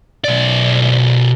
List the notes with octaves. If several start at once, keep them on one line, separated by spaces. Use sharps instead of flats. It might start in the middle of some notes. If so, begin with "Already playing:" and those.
B1 D5